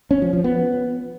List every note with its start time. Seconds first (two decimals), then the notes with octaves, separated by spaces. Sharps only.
0.11 C#4
0.22 F3
0.33 F3
0.44 B3